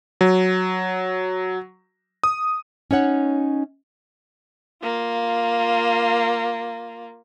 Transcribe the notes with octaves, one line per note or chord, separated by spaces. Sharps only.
F#3
D#6
C#4 D#4 C#5 F#5
A#3 F4